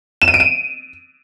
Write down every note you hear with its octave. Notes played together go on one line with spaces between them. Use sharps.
E7
D#7
D7
D#7